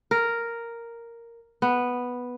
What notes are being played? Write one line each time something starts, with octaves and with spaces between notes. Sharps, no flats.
A#4
B3